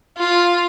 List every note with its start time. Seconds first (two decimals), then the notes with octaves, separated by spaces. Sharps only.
0.18 F4